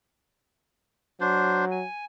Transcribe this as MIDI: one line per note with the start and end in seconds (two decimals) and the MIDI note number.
1.21 1.84 54
1.21 1.65 62
1.21 1.65 72
1.71 2.05 80